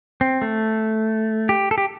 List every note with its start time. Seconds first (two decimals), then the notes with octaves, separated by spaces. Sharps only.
0.21 C4
0.42 A3
1.49 G4
1.71 A4
1.78 G4